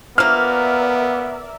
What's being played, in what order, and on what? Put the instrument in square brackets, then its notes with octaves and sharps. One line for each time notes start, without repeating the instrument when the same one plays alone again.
[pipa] F3 A#3 [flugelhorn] B3 [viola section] A#4 D5 E5 [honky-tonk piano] F6